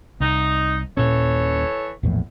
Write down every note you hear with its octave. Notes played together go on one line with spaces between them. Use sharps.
C2 D#4
D#1 A#2 E3 C#4 A4 C#5
A#1 E2 A2